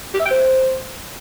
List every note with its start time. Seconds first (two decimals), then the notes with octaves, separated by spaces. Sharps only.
0.14 G4
0.20 E5
0.25 G5
0.31 C5